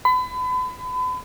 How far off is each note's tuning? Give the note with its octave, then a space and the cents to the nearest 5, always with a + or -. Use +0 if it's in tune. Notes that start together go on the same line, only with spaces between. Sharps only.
B5 +35